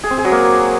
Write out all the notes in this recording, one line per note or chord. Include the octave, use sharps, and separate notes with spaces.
G#4
C4
G#4
F#3
A#3